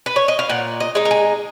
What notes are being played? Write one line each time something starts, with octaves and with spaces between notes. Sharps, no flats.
B4
C#5
D#5
F5
A#2 F#5
D#5
G#3 D#4
A#4
G#4